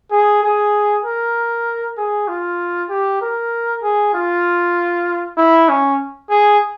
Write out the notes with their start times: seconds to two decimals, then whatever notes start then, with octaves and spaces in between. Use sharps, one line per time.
0.11 G#4
0.43 G#4
1.04 A#4
1.97 G#4
2.28 F4
2.89 G4
3.21 A#4
3.82 G#4
4.14 F4
5.37 E4
5.69 C#4
6.30 G#4